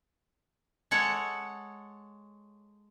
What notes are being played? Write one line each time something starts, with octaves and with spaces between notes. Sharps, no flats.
G#3 A4 C#5 F#5